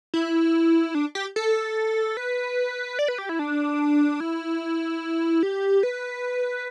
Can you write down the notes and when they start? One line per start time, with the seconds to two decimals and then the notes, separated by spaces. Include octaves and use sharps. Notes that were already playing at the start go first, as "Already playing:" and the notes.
0.14 E4
0.95 D4
1.15 G4
1.36 A4
2.17 B4
2.99 D5
3.08 B4
3.18 G4
3.29 E4
3.39 D4
4.20 E4
5.43 G4
5.83 B4